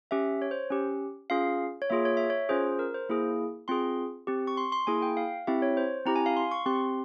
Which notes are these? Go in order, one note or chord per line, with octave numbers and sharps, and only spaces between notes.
C#4 G4 E5
C#5
C5
C#4 G4
C#4 F4 G#4 F5
C#5
A#3 F4 G#4 E5
C#5
E5
C#5
C#4 F4 G#4 C5
A#4
C5
A#3 E4 G#4
C4 F4 G#4 C6
C4 G4
C#6
C6
C6
A#3 E4 G#4 G#5
G5
F5
C4 E4 G4 E5
C#5
C5
C4 E4 G4 A#5
G#5
F5
C6
C#6
C4 G4 C6